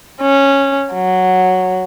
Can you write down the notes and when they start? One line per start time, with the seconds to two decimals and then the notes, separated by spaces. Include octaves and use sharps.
0.22 C#4
0.94 F#3